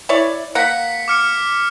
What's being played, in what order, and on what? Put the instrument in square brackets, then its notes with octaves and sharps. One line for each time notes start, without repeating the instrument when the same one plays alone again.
[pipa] E4 C#5 D5
[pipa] A#3 F#5 [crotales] B6 C#7
[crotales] D6 F6 C#7